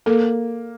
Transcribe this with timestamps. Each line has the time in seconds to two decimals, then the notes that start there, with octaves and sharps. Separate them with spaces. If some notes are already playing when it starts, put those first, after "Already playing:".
0.06 A#3 A4